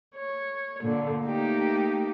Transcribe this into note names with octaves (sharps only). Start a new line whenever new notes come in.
C#5
A#2 D3
A3 A#3 D#4 G4